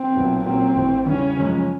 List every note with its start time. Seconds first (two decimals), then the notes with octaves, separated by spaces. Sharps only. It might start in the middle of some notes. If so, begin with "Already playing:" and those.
Already playing: C4
0.15 B1 A#2 F#3 B3
0.45 A#2 F#3 A#3 C4 C#4
0.75 A1 A2 E3
1.06 E2 C#3 E3 G3 C#4
1.37 F#2 C#3 F3 G#3